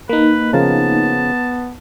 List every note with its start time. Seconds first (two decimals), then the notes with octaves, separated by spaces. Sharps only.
0.09 A#3 D#4 B4
0.53 C#3 F3 B3 A#4 A5